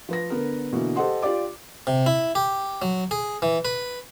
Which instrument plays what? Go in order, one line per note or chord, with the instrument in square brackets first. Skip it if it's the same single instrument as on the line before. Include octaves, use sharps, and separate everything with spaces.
[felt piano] F3 B4 A#6
D3 B3 A#4
B2 D3 E3 A#3
G4 A4 C5 D#5 F#5 C6
F4 G4 D5 D6
[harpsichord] C3
E4
G4
F#3
G#4
E3
B4